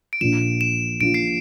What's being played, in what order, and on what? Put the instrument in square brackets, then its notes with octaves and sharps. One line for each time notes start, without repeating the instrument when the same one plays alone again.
[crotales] D7
[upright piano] A#1 A#2 F3 [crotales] E7
[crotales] E7
[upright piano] A#1 A#2 F3 [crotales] D7
[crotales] C7